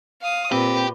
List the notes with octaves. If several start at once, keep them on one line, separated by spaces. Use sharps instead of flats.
F5 D#6
A#2 C4 G4 B4